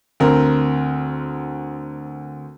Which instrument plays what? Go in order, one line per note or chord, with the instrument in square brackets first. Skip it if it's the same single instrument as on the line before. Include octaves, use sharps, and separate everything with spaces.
[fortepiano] D2 C4 A#4